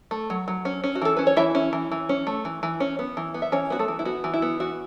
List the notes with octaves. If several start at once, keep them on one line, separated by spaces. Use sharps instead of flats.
A3
F#3
F#3
C#4
C#4
F#4
E3 A4
C#4 B4
C#5
E3 E4 E5
C#4
E3
E3
C#4
A3
E3
E3
C#4
B3
E3
B3
E5
E3 C#4 C#5
B3 F#4
A3 A4
E3
E4
B3 F#4
E3
E4
B3
E3 F#4